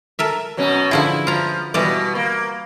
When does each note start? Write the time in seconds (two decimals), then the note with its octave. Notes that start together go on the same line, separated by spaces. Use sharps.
0.19 A4 A#4 E5
0.57 B2 F#3 C#4
0.91 D3 F3 E4 G#4
1.27 F3 F4 A#5
1.74 B2 E3 G3 D5
2.15 A#3